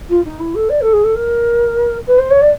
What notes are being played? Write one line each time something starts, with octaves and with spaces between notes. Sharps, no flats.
F4
D#4
E4
A4
D5
A4
G#4
A4
A#4
B4
C5
C#5
D5